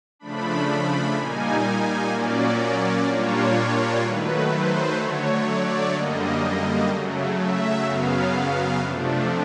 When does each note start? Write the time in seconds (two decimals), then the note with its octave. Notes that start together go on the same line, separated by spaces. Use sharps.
0.19 C#3 F3 A3 D4 B5
1.15 A#2 G3 A#3 D#4 G#5
2.10 A#2 F#3 A#3 C#4 D5
3.07 A#2 G3 A#3 D4 F4 C#5
4.01 D#3 F#3 A3 B4
4.49 C5
4.97 D3 F#3 A3 C#5
5.45 D5
5.92 F#2 D3 G3 A#3 D#5
6.87 C#3 F#3 A3
7.36 E5
7.83 F#2 C#3 F#3 B3 F5
8.80 C3 F3 A3 D4